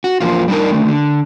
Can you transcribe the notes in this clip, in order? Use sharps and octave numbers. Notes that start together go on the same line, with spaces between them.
F#4
E2 F3 A#3 F4
G3 D4 D#4 A#4
D3 D#3 A3
D3